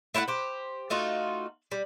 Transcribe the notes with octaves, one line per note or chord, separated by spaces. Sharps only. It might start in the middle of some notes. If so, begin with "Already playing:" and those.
A3 E4 F4 F#5
G4 C5
A3 D#4 F4 F#4
G3